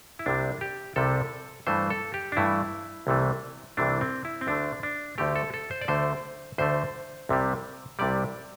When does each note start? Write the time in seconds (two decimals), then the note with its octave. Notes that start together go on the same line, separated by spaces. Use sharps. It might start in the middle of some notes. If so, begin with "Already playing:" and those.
0.19 E4
0.26 C2 C3 G3 D4
0.61 G4
0.96 C2 C3 G3 A4
1.67 G2 E3 A3 C5
1.90 A4
2.14 G4
2.32 D4
2.37 G2 E3 A3 E4
3.07 C2 C3 E3 A3
3.77 C2 C3 E3 A3 D4
4.01 C4
4.25 E4
4.41 C4
4.47 D2 D3 A3 D4
4.83 D4
5.18 D2 D3 A3 G4
5.36 A4
5.54 A4
5.71 C5
5.81 D5
5.88 D2 D3 A3 C5
6.58 D2 D3 A3 C5
7.29 C2 C3 G3
7.99 C2 C3 G3 D5